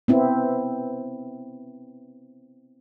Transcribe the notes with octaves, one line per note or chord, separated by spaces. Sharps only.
B3 C4 E4